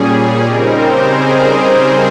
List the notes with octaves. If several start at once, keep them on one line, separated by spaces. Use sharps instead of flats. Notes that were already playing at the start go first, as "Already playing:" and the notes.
Already playing: A#2 G3 C#4 G#4
C#3 G3 C4 D#4 A#4
C5
G#4
A#4